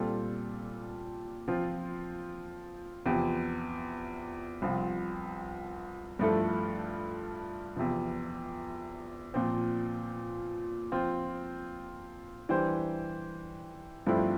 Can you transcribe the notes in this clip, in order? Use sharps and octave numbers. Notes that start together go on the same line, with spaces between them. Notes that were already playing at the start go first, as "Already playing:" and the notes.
Already playing: A#2 G3 C4 F4 A4
F3 C4 F4
E2 C3 F3 C4 G4
C2 C3 F3 C4 F4
G2 F3 A3 E4 A4
E2 C3 F3
A#2 F3 C4
F3 C4 F4 C5
E3 G3 D4 G4 C5
G2 F3 A3 C4 E4